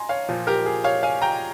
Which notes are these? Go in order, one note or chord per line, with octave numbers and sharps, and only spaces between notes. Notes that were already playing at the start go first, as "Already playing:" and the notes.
Already playing: G#5 A#5 C6
C#5 F5
A#2 F3
G4 A#4
G#4
C#5 F5
F5 G#5
G5 A#5